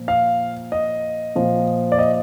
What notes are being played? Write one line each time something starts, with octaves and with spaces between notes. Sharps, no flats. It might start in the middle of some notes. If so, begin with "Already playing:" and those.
Already playing: A#2 F3
F5
D#5
A#2 F3
D5
D#5